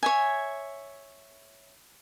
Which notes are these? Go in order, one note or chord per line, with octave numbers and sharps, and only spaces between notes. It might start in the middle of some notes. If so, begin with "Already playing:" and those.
C#5 E5 G#5